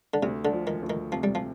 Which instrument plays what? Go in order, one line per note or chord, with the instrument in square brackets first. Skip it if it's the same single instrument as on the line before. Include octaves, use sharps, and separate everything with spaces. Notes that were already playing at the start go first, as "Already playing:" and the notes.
[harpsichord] D3
[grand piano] D2 [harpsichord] C3
[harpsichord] D3
[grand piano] F3
[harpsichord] D#3
[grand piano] D2
[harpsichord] D#3
[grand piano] C3 [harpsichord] F3
[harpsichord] G3
F3